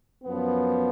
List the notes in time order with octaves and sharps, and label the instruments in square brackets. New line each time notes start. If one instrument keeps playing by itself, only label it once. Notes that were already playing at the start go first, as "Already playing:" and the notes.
[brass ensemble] F#2 F3 B3